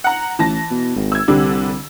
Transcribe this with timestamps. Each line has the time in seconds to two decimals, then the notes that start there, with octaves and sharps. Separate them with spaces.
0.04 F#5 A#5
0.39 A1 E3 A5 A#6
0.71 B2
0.96 G#1
1.12 E6 G#6
1.28 C2 D3 G3 D4